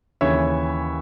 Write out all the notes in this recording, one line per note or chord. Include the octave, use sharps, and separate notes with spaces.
D#2 C#3 E3 C#5 E5